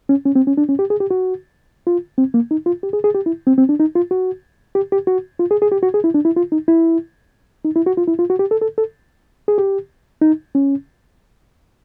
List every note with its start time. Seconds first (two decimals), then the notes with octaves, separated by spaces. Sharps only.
0.09 C#4
0.26 C#4
0.36 C4
0.47 C#4
0.58 D4
0.69 C#4
0.79 G4
0.90 G#4
1.00 G4
1.11 F#4
1.87 F4
2.18 C4
2.34 A#3
2.51 D#4
2.66 F4
2.83 G4
2.93 G#4
3.04 G#4
3.15 G4
3.26 E4
3.47 C4
3.58 C4
3.69 D4
3.80 D#4
3.95 F4
4.11 F#4
4.75 G4
4.92 G4
5.07 F#4
5.39 F4
5.51 G#4
5.62 G#4
5.72 G4
5.83 F#4
5.94 G#4
6.04 E4
6.14 D4
6.25 E4
6.36 F4
6.52 D#4
6.68 E4
7.65 D#4
7.76 E4
7.86 F#4
7.97 F4
8.08 E4
8.19 F4
8.30 F#4
8.39 G4
8.51 A4
8.62 A4
8.78 A4
9.48 G#4
9.58 G4
10.21 D#4
10.55 C#4